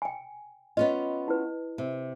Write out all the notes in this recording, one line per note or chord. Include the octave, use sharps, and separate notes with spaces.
G5 G#5
B3 C#4 F4 D#5
E4 B4
C3